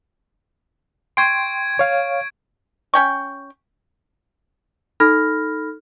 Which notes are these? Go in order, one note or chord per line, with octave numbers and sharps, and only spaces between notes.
G5 C6 C#6 G#6 D7
C#5 F5
C#4 G5 C#6
D#4 A4 B5 F6 A#6